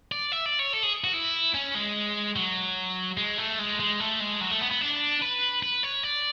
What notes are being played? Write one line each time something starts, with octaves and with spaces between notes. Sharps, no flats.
D5
E5
D5
C#5
A4
G#4
F#4
E4
C#4
G#3
F#3
G#3
A3
G#3
G#3
A3
G#3
F#3
A3
B3
B3
D4
B4
B4
C#5
D5